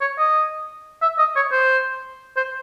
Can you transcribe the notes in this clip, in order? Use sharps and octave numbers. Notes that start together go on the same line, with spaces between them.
C#5
D#5
E5
D#5
C#5
C5
C5